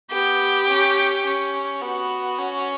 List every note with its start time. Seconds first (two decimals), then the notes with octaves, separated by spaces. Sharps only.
0.10 B3 G4
0.68 C#4
1.25 C#4
1.82 B3 F#4
2.38 C#4